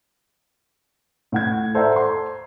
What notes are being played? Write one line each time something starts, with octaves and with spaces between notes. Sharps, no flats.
A2 F#5 G#6
A4 C5 D5 E5 F#5 A#5
C6